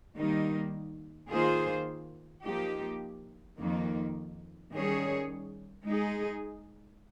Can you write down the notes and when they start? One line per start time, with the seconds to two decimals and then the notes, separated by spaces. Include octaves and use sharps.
0.17 D#3 G3 A#3 D#4
1.30 D#3 A#3 F4 G#4 C5
2.44 F3 A#3 D#4 G4
3.58 F2 D#3 A#3
4.72 D#3 G3 C#4 G#4 C#5
5.86 G#3 D#4 G#4